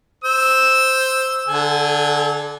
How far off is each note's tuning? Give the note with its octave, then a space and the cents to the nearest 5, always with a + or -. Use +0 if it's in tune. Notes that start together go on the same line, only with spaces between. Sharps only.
C5 +0 E6 -5
D3 +0 A4 -40 G#5 +0